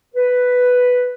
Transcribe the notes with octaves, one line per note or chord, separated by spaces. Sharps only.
B4